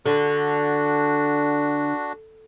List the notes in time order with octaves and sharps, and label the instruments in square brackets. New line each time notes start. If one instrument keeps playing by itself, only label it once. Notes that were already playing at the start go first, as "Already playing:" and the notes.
[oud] D3 [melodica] D4 F#4